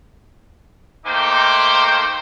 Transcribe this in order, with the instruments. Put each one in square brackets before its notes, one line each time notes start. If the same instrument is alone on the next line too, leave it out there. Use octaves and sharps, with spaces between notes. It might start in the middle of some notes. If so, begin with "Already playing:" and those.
[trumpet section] A3 A#3 D#4 C5 G5 D6